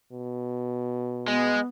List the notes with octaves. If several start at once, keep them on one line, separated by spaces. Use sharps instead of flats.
B2
G#3 B3